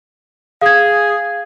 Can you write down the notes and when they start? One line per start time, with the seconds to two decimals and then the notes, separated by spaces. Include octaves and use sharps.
0.61 G#4 F5 G#6